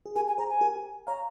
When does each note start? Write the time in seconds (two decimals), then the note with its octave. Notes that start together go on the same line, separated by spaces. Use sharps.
0.06 G#4
0.15 G4 A#4 G#5
0.27 G#5
0.38 G#4 C5 A#5
0.50 G#5
0.61 G4 A#4
1.07 C#5 F5 A#5